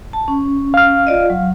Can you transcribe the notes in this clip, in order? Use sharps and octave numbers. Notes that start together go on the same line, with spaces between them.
A5
C#4
F5 F6
F4 D5 D#5
F#3